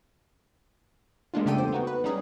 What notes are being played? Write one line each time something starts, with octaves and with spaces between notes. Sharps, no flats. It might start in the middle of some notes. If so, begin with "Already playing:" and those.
G3 G#3 A#3 D4 F4
C#3 A3 G4 A4 G5 D#7
E2 C5
B3 D#4 F#4
B4
G3 C#4 D#4 G#4